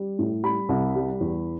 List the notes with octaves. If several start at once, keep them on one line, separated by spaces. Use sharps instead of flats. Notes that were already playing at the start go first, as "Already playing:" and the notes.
Already playing: G3
A2
G3 B5
C2
G3
E2